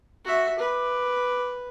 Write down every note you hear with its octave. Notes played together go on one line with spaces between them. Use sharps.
F#4 E5
B4 D6